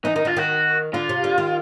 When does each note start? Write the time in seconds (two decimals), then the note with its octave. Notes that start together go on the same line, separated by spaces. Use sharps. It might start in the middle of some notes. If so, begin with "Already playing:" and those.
0.05 E3 D#4
0.16 D#3 D#4
0.25 D3 F4
0.37 D#3 F#4
0.94 D3 F4
1.09 C3
1.24 D3
1.38 D#3